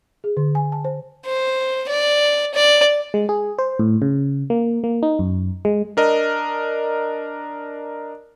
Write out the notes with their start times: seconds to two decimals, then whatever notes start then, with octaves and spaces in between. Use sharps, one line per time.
0.24 G#4
0.37 D3
0.55 G#5
0.72 A5
0.85 C5
1.25 C5
1.89 D5
2.54 D5
3.14 G#3
3.29 G#4
3.59 C5
3.79 A2
4.02 C#3
4.50 A#3
4.84 A#3
5.03 D#4
5.19 F#2
5.65 G#3
5.97 D4 A#4 D#5